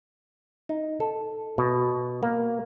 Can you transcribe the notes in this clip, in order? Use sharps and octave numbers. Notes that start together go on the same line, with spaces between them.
D#4
A4
B2
A#3